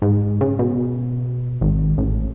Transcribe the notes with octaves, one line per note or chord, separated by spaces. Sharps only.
G#2
C#3
B2
G#1
A1